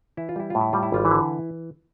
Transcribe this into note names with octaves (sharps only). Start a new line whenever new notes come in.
E3 E4
F4
G3 E4
A2 F4
E4
G3 F4
E4
G#1 F4
E3 E4
D3